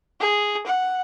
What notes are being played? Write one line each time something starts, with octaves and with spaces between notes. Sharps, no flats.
G#4
F#5